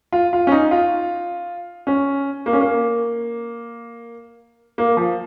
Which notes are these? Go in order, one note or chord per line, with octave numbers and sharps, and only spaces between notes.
F4
F4
C#4
D#4
F4
C#4
A#3
C#4
A#3
A#3
F3